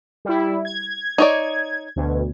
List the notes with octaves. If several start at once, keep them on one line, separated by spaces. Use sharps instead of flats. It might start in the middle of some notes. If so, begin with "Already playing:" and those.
G3 E4
G#6
D#4 C#5 D5
D2 B2